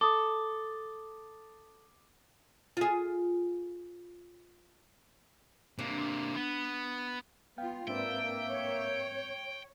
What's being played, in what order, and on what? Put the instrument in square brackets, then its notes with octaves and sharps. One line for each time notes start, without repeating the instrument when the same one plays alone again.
[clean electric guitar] A4 [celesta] D6 D#6
[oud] F4 G#4
[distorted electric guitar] C3 A#3 [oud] D4
[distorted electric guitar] B3
[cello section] B3 F4 [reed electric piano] F5 G5
[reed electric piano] G#2 C4 B4 [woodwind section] A#3 E5 [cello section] D4 [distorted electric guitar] G5
[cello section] C#5